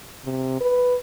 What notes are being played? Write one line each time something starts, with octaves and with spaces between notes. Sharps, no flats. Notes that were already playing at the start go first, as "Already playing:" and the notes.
C3
B4